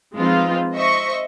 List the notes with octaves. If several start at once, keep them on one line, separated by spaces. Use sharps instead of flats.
F3 G#3 C4 D#4 F4 B4
C5 D#5 E5 C#6